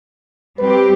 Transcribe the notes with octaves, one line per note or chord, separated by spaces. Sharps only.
G3 C4 G4 B4